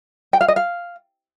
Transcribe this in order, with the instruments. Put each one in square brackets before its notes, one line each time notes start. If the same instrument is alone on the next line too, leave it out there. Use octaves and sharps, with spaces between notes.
[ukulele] G5
F5
D#5
F5